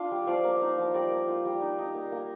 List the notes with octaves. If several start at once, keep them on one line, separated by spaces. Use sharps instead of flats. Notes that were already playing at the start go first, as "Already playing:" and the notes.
Already playing: D4 F4 F5
G3
F3 D5 F5
A#3
D#4
F3
G3 A#4 D5
A#3
F4
G3
D#4
D#4
A#3
A#3